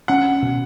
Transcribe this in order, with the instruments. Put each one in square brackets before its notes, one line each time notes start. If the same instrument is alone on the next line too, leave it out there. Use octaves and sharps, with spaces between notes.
[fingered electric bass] C#4 [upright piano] F#5
[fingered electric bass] B2